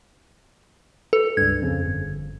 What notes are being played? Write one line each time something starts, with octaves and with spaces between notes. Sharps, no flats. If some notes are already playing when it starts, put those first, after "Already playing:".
A4 B4
C#2 G2 G#6
F2 C#3
G1